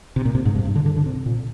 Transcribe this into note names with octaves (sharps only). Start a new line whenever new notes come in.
C3
A#2
C3
G#2
G2
G2
D3
D3
D3
C3
A#2